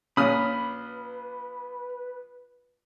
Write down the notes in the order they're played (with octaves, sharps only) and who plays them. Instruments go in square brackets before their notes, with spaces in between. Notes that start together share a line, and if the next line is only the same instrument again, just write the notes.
[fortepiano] A#1 A#2 D#6 [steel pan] C#4 [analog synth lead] B4 [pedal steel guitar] B5 F6